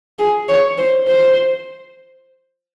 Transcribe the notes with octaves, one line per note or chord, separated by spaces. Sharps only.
G#4
C#5
C5
C5